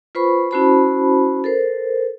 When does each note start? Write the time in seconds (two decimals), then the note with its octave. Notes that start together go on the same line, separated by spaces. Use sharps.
0.15 F4 B4 C5 B5 C#6
0.51 C#4 E4 F#4 C5 A5 B5
1.44 A4 A#4 C5